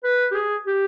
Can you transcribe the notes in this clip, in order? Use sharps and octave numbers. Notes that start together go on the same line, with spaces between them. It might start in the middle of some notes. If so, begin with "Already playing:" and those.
B4
G4
G#4
G4